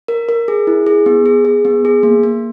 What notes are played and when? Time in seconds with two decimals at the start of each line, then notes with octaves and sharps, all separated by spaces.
0.08 A#4
0.29 A#4
0.48 G#4
0.67 E4
0.87 G#4
1.06 B3
1.26 G#4
1.45 G#4
1.65 B3
1.85 G#4
2.03 A#3
2.23 A#3